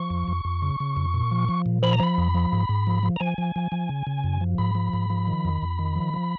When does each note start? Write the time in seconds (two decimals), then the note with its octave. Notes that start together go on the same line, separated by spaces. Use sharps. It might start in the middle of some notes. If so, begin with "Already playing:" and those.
Already playing: F3 C#6
0.10 F2
0.28 F2
0.45 F2
0.62 C#3
0.80 C#3
0.97 F2
1.14 A#2
1.31 F3
1.49 F3
1.66 A#2
1.83 F3 B5
1.93 A#5
2.00 F3 B5
2.18 F2
2.35 F3
2.52 G#2
2.69 G#2
2.87 F3
3.03 F3
3.16 A#5
3.20 F3 G#5
3.38 F3
3.56 F3
3.72 F3
3.89 C#3
4.07 C#3
4.24 F#2
4.41 F3
4.58 G#2 B5
4.75 F3
4.93 G#2
5.10 F3
5.27 D#3
5.45 F2
5.62 F2
5.79 D#3
5.96 F3
6.14 F3